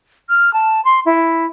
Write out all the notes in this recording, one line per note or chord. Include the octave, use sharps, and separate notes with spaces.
F6
A5
C6
E4